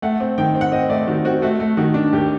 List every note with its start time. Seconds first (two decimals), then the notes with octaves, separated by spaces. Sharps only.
0.02 A3 F#5
0.20 C4
0.38 D#3 G5
0.55 C4
0.61 F#5
0.72 C4 D#5
0.89 A3 D5
1.07 D#3 F#4
1.25 C4 F#4
1.42 A3 F#4
1.60 A3
1.77 D#3 F#4
1.94 D4
2.13 D#2 G4